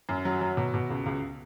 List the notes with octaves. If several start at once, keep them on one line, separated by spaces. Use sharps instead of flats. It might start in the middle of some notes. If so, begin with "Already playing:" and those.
F#2
F#3
F#3
B2
B2
C#2
C#2